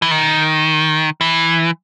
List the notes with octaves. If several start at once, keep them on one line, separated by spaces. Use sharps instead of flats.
E3
D#3
E3